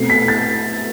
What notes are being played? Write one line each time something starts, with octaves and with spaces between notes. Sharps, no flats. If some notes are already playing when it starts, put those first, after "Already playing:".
Already playing: B2 A3 C4 C7
B6
A6